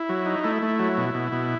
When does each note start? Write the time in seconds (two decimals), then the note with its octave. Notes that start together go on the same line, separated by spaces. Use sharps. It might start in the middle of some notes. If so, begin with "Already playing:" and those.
Already playing: E4
0.09 F#3
0.26 D#4
0.43 A3 E4
0.62 A3
0.79 F#3
0.97 B2
1.14 B2
1.32 B2